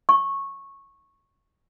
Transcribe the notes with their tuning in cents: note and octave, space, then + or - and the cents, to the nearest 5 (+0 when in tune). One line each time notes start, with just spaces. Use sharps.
C#6 -15